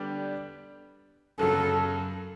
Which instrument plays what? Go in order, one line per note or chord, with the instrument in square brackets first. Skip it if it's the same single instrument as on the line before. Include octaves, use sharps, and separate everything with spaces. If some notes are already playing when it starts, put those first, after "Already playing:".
Already playing: [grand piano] D3 G3 B3 D4 G4
[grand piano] F#2 C#3 F#3 [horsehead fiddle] A4